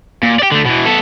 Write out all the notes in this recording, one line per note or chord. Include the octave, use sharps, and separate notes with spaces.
A#2
G4 D5
D3 A3
B2 E3
B3 A4